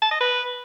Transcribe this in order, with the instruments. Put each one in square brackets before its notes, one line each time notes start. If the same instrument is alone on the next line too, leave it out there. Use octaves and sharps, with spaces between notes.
[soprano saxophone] A5
D#5
B4